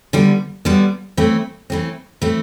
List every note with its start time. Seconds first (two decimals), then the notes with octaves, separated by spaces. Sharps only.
0.13 D3 G3 B3
0.65 D3 G3 B3
1.17 E3 A3 C4
1.70 E3 A3 C4
2.22 E3 A3 C4